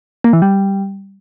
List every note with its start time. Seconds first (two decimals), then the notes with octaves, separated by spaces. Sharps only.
0.24 A#3
0.33 E3
0.42 G3